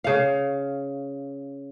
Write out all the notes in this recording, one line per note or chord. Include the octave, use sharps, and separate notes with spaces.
C#3 F5